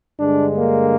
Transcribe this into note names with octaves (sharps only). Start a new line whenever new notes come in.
G2 D3 G#3 D4
A#3